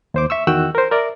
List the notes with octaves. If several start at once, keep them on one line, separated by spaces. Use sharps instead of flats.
D#2 C5 D6
E5 C#6 E6
E2 D#3 F#4 G5 E6 F#6
A#4 C5
A#4 D5 E5